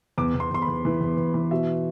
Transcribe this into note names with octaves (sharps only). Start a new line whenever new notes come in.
E2 D6
E2
C6
E2 C6
B5
E2
E3
E2
E2
E3
B2 E5